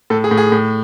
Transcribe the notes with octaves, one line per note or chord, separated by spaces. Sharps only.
A2 A4
G#4
A2
G#4
A2